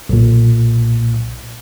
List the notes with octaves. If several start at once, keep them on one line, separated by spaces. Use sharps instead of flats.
B1 A#2